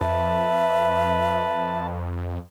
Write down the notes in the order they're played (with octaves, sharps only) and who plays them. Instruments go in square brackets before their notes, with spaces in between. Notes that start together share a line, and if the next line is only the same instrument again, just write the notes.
[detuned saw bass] F2 [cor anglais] B4 [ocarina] E5 [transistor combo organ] A5